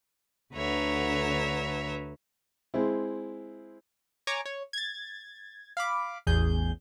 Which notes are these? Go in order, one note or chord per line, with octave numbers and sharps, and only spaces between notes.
D2 D3 B4 C#5 E5 A#5
G#3 C4 E4
C#5 G#5 A#5 C#6 D6
C#5
G#6 A6
F5 B5 D6
A1 E2 G#4 G6